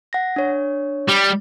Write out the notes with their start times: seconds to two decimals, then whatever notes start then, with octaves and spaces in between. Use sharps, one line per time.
0.13 F#5 A#6
0.36 D4 C#5
1.08 G3